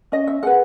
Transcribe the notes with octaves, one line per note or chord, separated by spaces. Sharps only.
C#4 D#5
E5
G#4 B4 F#5